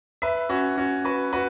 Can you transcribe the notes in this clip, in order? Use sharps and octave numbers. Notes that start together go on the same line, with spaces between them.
B4 E5
C#4 F#4
C#4 F#4
F#4 B4
F#4 B4